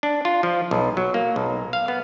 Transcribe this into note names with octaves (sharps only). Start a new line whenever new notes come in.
D4
F4
F3
B1
F#3
A#3
B1
F5
B3